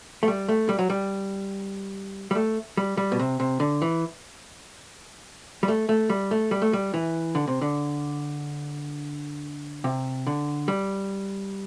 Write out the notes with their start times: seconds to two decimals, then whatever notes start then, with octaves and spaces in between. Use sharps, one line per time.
0.23 A3
0.28 G3
0.49 A3
0.69 G3
0.79 F#3
0.90 G3
2.31 G3
2.35 A3
2.77 G3
2.97 G3
3.12 B2
3.19 C3
3.40 C3
3.60 D3
3.82 E3
5.63 G3
5.68 A3
5.89 A3
6.10 G3
6.31 A3
6.51 G3
6.62 A3
6.73 G3
6.94 E3
7.35 D3
7.48 C3
7.61 D3
9.84 C3
10.27 D3
10.68 G3